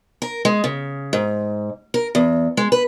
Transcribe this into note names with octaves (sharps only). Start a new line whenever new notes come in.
A#4
G#3
C#3
G#2
A#4
E2
G#3
B4